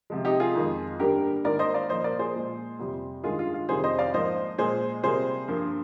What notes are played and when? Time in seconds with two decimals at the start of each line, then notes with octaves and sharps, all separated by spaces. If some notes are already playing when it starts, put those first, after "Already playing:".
0.10 C3 F3 G#3
0.25 D#4 G4
0.40 F4 G#4
0.55 F2 D#3 G#3
1.00 G2 D3 G3 A#3 G4 A#4
1.45 G#2 D#3 A#3 A#4 D5
1.59 C5 D#5
1.74 D5 F5
1.89 A#2 F3 A#3 C5 D#5
2.04 A#4 D5
2.19 G#4 C5
2.34 A#2 G#3
2.79 F2 C3 G3
3.24 G2 D#3 G#3 F4 G#4
3.39 F4
3.54 F4
3.69 F2 C3 D#3 G3 G#4 C5
3.84 C5 D#5
3.99 D5 F5
4.14 G#2 F3 A#3 C5 D#5
4.58 A#2 G#3 G#4 C5
5.03 C3 G3 A#3 G#4 C5
5.48 G2 F3 A#3